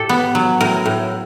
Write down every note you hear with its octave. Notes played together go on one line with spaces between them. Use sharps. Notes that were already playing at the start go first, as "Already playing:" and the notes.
Already playing: A2 G4 A4
B3
F#3
A2 A#4
A2